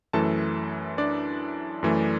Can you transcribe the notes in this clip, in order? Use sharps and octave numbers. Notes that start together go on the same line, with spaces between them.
F#2 E3 A3 A4 A5
D4 D5
F#2 E3 A3